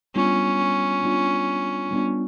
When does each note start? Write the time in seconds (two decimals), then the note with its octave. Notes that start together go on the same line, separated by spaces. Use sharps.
0.16 G3 B3 C#4 D4 F4
1.04 G3 B3 D4 F4
1.91 G3 B3 D4 F4